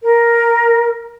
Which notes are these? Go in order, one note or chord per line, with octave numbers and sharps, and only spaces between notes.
A#4